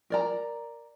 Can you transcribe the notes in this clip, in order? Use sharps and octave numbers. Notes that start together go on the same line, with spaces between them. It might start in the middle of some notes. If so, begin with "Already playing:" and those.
A#4 D5 A#5